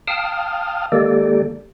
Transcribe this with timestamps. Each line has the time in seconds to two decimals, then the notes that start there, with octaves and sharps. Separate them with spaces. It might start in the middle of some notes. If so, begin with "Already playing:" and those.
0.08 F5 G5 A5 D#6 F6
0.92 D#3 G#3 A#3 G4 A4 D5